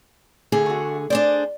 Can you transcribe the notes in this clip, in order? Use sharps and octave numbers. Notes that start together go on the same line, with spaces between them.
D2 D3 G#4
A3 F#4
D4 G#4 C5 D5